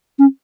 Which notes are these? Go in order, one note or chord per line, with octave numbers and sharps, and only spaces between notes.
C#4